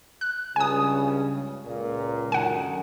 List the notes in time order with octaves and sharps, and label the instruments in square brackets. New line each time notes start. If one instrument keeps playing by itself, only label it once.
[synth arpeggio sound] F#6
[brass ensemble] C#2 G2 C#3 [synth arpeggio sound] G#5 D#6
[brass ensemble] C#2 A#2
[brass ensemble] F#2 D3 D#3 [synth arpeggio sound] F#5 G#5